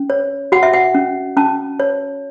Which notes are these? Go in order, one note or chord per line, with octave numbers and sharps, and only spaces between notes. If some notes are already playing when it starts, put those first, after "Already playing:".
Already playing: C#4
C#5
F#4 F#5
E5
F#5
C#4
C#4 A5
C#5